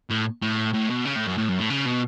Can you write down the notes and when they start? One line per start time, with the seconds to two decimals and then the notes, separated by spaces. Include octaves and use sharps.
0.10 A2
0.42 A2
0.74 A2
0.90 B2
1.05 C#3
1.16 A2
1.27 F#2
1.38 A2
1.49 F#2
1.59 A2
1.70 C#3
1.86 B2